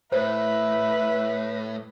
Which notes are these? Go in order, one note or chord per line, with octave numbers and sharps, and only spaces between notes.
A2 B4 C5 E5